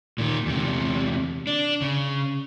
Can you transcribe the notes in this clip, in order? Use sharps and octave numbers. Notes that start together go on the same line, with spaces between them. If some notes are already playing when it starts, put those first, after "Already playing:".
A#2 D#3
E2 C3
D4
C#3